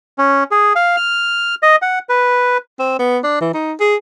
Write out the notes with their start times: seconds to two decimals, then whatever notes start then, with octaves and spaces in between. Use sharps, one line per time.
0.18 C#4
0.51 G#4
0.76 F5
0.96 F6
1.63 D#5
1.82 F#5
2.09 B4
2.79 C4
2.99 B3
3.24 D4
3.41 E3
3.54 D#4
3.80 G#4